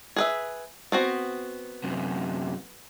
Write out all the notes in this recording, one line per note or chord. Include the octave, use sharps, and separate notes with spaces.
G#4 B4 E5
B3 C4 F#4
F#2 C3